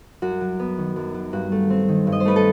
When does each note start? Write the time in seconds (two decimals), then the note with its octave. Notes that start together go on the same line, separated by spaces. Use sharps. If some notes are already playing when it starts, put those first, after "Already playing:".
0.22 F#2 F#4
0.41 F#3
0.59 B3
0.78 D#3
0.96 F#2
1.14 F#3
1.33 G2 F#4
1.52 A3
1.70 C4
1.88 D#3
2.07 G2
2.12 D#5
2.20 C5
2.25 A3 B4
2.36 A4